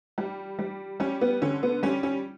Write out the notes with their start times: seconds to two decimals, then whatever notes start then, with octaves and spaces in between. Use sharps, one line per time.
0.18 G3
0.59 G3
1.00 G3 C#4
1.21 B3
1.42 D3 C#4
1.63 B3
1.83 G3 C#4
2.03 C#4